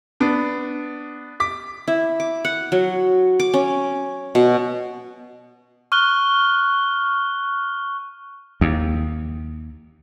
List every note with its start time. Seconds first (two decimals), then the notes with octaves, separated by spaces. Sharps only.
0.20 B3 D4
1.40 D6 B6
1.88 E4
2.20 D6
2.45 F#5
2.72 F#3
3.40 D6
3.54 C#4
4.35 B2
5.92 C#6 F6 F#6 G7
8.61 D#2